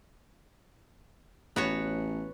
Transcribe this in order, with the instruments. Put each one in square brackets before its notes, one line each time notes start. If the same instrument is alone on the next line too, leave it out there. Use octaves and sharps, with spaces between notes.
[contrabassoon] A1 [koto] B3 F#4 C#5